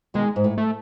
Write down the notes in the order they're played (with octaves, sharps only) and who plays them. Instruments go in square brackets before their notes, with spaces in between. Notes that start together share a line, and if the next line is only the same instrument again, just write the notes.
[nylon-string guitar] B2 D#3 [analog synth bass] G#3
[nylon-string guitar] G#2
A2
[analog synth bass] A3